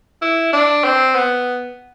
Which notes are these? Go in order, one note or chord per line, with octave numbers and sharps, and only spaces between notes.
E4
D4
C4
B3